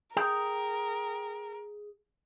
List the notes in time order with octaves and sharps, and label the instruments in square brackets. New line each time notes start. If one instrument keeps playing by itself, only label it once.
[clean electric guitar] G#4 G5 [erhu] A#4